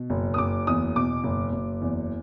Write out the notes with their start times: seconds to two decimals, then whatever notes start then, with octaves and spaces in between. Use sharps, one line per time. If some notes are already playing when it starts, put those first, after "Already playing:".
Already playing: B2
0.10 F#1
0.34 D#6
0.38 F#1 D6
0.67 E2 D#6
0.95 B2 D6
1.24 F#1
1.52 F#1
1.82 E2